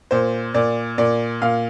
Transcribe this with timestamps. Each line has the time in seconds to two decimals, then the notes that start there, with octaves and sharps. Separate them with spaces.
0.11 A#2 C5
0.54 A#2 D5
0.98 A#2 D5
1.42 A#2 F5